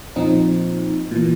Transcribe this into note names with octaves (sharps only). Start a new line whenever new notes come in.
A#2 F3 C4 D#4
A#2 E3